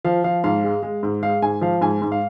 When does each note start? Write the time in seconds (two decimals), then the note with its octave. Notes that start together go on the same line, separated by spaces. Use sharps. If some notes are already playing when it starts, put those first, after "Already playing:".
0.05 F3 F5
0.24 F3 F5
0.44 G#2 F5
0.64 G#3
0.83 G#3
1.03 G#2
1.22 G#3 F5
1.42 G#2 G#5
1.61 F3 F5
1.81 G#2 G#5
2.02 G#2
2.12 F5